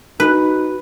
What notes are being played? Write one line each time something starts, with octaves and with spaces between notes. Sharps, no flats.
D#4 F#4 B4
D#4